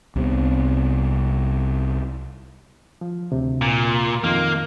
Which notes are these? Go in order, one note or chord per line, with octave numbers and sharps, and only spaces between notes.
C2 C3 B3
F3
D2 C3
A#2
F2 D#3 A#3